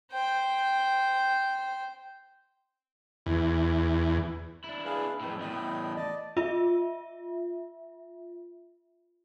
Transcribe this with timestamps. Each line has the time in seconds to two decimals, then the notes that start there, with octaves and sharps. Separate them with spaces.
0.12 C5 G5
3.26 E2
4.64 D4 E4
4.85 G#4 B4 F5
5.20 F2 A2 G5
5.40 E2 A2 D#5 G5 B5
5.96 D5 D#5 A5
6.37 F4 E5